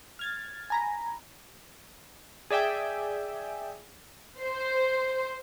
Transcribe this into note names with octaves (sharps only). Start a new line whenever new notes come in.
F6 G#6 A6
G#5 A#5 B5
G#4 D5 E5 G5 G#5
C5